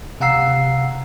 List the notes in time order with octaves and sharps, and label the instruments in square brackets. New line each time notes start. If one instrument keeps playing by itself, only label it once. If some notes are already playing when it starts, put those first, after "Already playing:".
[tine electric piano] C3 F5 F#5 A#5 E6 C7